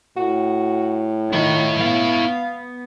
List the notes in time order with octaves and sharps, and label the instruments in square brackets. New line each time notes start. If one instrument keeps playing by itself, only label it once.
[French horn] A2 [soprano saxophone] F#4
[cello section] D#3 [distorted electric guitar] E4 C#5 [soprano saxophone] F4
[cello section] B3 [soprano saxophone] F5